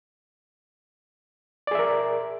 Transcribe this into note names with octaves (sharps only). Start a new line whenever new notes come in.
G#4 A#4 D5 E5